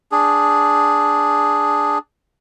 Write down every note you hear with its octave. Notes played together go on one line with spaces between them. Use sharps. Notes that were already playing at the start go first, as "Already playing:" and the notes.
D4 G#4